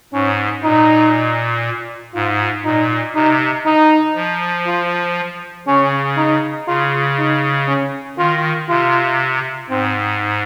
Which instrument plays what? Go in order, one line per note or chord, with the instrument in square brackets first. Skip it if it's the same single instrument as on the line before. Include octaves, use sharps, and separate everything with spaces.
[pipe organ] G#2 [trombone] C#4
[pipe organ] A#2 [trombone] D#4
[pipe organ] G#2 [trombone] F4
[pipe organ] A#2 [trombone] D#4
[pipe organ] C3 [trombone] D#4
[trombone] D#4
[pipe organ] F3
[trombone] F4
[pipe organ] C#3 [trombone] C#4
[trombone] D#4
[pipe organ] C#3 [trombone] F4
[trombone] D#4
C#4
[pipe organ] D#3 [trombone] F4
[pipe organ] C3 [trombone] F4
[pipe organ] G#2 [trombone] C4